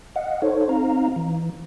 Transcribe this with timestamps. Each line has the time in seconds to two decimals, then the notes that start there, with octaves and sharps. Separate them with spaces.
0.16 D#5 F5 F#5
0.42 D#4 A4 C5 C#5
0.69 C4 D#4 F5 A#5
1.16 E3